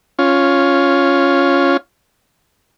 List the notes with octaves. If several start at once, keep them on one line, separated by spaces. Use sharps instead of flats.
C#4 F4